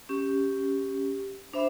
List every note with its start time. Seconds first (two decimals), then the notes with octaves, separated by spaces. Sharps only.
0.09 C#4 G4
1.53 D4 C5 E5 B5